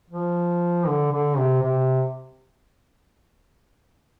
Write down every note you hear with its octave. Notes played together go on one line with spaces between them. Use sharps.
F3
D3
D3
C3
C3